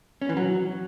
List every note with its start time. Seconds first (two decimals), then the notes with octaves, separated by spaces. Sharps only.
0.22 C#4
0.29 E3
0.37 F#3